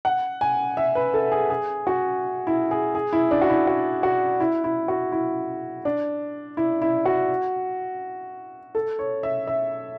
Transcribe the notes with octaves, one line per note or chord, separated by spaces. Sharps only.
F#5
G#5
E5
B4
A4
G#4
G#4
F#4
E4
G#4
G#4
E4
D4
F#4
E4
F#4
F#4
E4
E4
F#4
E4
D4
E4
E4
F#4
A4
C#5
E5
E5